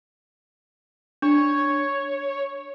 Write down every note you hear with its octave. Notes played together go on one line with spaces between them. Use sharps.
D4 C#5